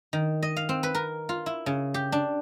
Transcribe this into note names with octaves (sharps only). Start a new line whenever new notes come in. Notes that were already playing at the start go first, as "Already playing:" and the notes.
D#3
D#5
F5
C4
B4
A#4
F4
E4
C#3
G4
D4